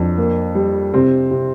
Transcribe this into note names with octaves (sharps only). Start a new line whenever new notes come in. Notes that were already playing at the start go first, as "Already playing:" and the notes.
Already playing: F2 D4
A#3
G3
C3 C4
C3